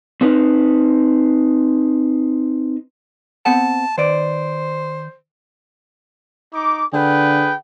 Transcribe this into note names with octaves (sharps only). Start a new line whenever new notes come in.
C4 D#4 B4
B3 C4 F#5 A5
D#3 B4 C5 D5
D#4 D6
D3 G#4 B4 G5